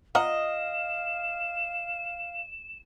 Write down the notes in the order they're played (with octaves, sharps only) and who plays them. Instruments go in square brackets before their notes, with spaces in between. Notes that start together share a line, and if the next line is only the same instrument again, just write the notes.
[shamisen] F4 F#5 A#5 [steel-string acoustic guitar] D#5 [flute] F5 [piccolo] E7